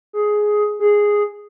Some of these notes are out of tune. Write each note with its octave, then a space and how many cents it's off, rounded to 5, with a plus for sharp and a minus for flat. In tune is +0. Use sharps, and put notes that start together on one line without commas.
G#4 +10
G#4 -5